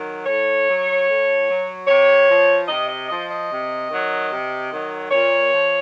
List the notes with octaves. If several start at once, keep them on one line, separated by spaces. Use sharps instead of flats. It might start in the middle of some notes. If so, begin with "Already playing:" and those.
Already playing: D#3 F#3
A2 C#5
F#3
A2
F#3
C3 C#5
F3
C3 D#5
D#5
F3 D#5
D#5
C3
D#3 F#3
C3
D#3 F#3
A#2 C#5
F3